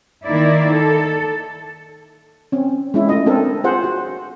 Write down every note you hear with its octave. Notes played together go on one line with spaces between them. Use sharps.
D#3 A#3 D#4 E4 D5
A4
C4 C#4
G#3 C#4 E4
A3 F4 D#5
C4 D4 A4 A#4
F4 G#4 C5 F#5
F#4